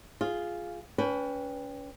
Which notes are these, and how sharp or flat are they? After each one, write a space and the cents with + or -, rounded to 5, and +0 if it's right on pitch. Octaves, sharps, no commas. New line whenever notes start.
F4 +0 G#4 +0
C#4 +30 B4 +0 G5 +15